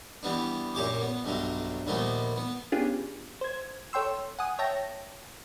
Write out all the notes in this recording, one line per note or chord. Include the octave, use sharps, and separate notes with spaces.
E3 G3 B3 D4
F#2 A#2 G4 C#5 D6
B3
B1 G2 F#3 A3
D#2 A#2 F3 A3 B3
B3
B3 C#4 D4 F4 G4 G#4
C5 G#6
A4 C#5 G5 C6 E6
F#5 G#5 D#6
C#5 E5 G5 A5 A#6